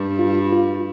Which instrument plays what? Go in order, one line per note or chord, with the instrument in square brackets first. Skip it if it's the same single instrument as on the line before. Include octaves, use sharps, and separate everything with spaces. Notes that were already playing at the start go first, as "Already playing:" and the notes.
Already playing: [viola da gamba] G2
[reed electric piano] F4
F4